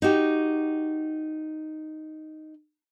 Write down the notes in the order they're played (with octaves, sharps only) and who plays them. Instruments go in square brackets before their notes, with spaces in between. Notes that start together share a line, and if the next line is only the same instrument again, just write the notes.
[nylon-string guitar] D#4 F#4 G4